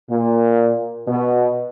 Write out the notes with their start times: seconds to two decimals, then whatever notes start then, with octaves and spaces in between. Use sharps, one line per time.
0.10 A#2
1.07 B2